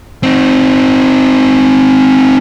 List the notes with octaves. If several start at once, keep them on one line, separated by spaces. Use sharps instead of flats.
C4 D#4